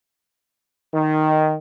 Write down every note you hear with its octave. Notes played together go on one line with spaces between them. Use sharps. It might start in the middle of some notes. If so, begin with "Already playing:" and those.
D#3